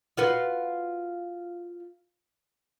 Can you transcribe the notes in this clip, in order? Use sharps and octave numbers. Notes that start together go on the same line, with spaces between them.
F4 F#4 B4